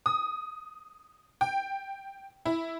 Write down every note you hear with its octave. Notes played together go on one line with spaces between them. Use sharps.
D#6
G5
E4